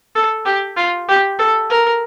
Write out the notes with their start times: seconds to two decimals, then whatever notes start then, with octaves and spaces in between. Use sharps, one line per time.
0.15 A4
0.45 G4
0.76 F4
1.08 G4
1.39 A4
1.70 A#4